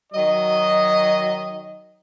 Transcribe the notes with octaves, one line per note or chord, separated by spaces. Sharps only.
D#3 F#3 D#5